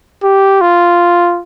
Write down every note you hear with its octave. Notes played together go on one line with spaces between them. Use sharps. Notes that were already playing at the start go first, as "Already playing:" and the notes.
G4
F4